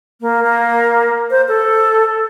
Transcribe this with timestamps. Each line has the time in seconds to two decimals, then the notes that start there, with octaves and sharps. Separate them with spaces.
0.21 A#3
0.43 A#3
1.30 C5
1.48 A4